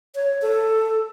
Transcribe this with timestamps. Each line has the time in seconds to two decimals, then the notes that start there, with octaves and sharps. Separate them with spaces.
0.15 C#5
0.42 A4